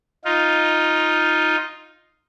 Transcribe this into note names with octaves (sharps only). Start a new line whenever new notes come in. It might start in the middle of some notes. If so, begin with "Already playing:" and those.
D#4 F4